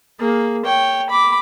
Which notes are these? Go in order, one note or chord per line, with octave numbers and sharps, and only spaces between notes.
A#3 G#4
C#5 G5
B5 D6